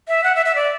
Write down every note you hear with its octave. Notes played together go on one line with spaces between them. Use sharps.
E5
F#5
E5
E5
D5